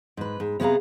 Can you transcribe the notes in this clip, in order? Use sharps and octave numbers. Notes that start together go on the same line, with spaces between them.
G#2 B4
G#2
C3 B3 G#4 F5 A#5